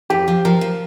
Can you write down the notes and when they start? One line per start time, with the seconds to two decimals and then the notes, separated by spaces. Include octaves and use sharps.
0.10 F2 G4
0.28 F3
0.45 F3 A#4
0.61 F3